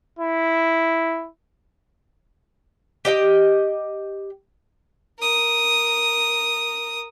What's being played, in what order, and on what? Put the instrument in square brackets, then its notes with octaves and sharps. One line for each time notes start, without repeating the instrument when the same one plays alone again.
[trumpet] E4
[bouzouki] G4 D#5 F#5 G5
[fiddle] A#4 D#6